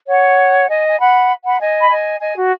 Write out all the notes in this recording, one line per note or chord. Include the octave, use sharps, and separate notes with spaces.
C#5 F#5
D#5 G#5
G#5
F#5 B5
F#5 B5
D#5 G#5
B5
D#5 G#5
D#5 G#5
F#4